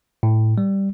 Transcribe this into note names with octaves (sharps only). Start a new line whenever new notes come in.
A2
G3